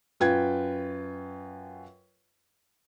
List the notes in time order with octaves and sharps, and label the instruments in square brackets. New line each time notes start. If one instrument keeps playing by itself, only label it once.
[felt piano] F#2 F4 B4 G5 G#6